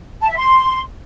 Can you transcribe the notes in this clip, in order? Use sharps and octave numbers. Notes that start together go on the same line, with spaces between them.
A5
E5
C6